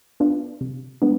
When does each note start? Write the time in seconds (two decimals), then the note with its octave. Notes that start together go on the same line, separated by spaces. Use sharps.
0.20 B3 D4 F4
0.61 C3
1.02 G#3 B3 D4